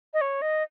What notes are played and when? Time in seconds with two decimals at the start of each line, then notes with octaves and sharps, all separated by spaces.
0.14 D#5
0.21 C#5
0.42 D#5